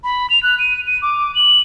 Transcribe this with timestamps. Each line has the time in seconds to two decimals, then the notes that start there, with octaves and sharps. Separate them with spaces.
0.04 B5
0.30 F7
0.43 F#6
0.59 D#7
0.87 D#7
1.02 D6
1.35 F#7